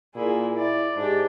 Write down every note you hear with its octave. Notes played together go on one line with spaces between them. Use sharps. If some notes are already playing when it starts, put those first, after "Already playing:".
A#2 E4 G#4
E4 D5
G#2 D4 G4